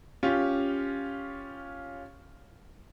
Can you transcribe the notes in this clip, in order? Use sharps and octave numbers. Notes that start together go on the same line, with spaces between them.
C#4 F4 G4